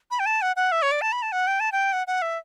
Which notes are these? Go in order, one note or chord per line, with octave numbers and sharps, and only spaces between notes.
B5
G5
A5
F#5
F#5
E5
C#5
D5
A5
B5
A5
F#5
G5
A5
G5
F#5
F#5
E5